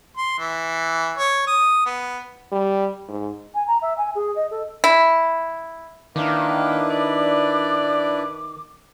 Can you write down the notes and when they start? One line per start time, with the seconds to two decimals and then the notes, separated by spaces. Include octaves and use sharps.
0.17 C6
0.39 E3
1.17 C#5
1.47 D#6
1.86 B3
2.52 G3
3.09 G#2
3.54 G#5
3.67 A#5
3.81 E5
3.97 G#5
4.15 G#4
4.35 D#5
4.50 A4
4.84 E4
6.16 D#3 A#3 D4 E4 B4 D6
6.90 D5